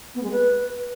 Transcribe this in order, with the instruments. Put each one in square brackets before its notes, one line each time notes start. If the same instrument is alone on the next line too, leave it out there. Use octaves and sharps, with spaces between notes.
[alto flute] B3
G#3
B4